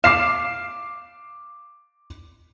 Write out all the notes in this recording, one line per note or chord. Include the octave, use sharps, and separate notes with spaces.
F5 D6 C7 E7